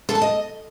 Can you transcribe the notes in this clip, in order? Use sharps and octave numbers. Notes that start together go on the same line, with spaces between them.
A4
A5
D#5